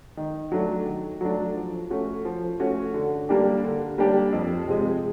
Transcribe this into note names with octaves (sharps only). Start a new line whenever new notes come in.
D#3
F#3 A3 D4
D#3
F#3 A3 D4
F3
A3 C#4 F#4
F3
A3 C#4 F#4
D3
G3 A#3 D4 G4
D3
G3 A#3 D4 G4
F2
C3 F3 G#3